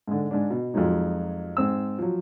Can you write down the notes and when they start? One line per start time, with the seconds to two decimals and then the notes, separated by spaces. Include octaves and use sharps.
0.08 G#2 D3
0.31 G#2 D4
0.50 B2
0.74 F2 F3 F#3 G#3 D#4
1.57 G#2 C4 E6
1.98 F3 F#3